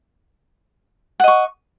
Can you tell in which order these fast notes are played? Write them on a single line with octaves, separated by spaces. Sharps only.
F#5 D#5 C#6